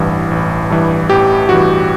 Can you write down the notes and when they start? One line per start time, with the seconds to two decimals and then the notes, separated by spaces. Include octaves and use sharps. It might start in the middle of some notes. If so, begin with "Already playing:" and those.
Already playing: A1 G2 E3
0.31 A1
0.70 G2 E3
1.09 A1 G4
1.49 G2 E3 F#4